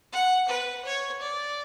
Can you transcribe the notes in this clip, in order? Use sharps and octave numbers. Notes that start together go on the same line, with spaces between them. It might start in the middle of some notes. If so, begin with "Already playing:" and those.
F#5
B4
C#5
D5